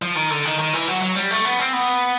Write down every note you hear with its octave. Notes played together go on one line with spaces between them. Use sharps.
F3
D#3
D3
D#3
D#3
E3
F#3
F#3
G3
A3
B3
C4
B3